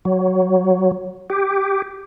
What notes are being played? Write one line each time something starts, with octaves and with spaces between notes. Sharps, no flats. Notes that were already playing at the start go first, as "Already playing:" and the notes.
F#3
G4